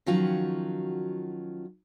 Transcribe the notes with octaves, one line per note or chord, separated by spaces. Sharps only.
D#3 F3 F#3 C#4 F4 F#4